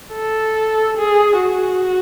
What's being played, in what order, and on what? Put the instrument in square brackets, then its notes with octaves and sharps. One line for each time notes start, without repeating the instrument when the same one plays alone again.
[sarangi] A4
G#4
F#4